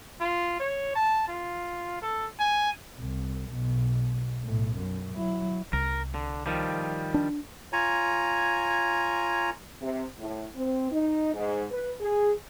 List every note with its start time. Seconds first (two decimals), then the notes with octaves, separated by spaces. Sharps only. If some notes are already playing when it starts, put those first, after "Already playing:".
0.20 F4
0.60 C#5
0.96 A5
1.28 F4
2.02 A4
2.40 G#5
2.99 C2
3.50 B1 B2
4.44 B1 A2
4.77 F#2
5.13 F#3 E4
5.73 C2 A#4
6.15 D3
6.46 D#3 F3 G3
7.14 D4
7.73 F4 C#5 G#5 A#5
9.81 C3
10.19 A2
10.55 C4
10.91 D#4
11.34 G#2
11.71 B4
12.00 G#4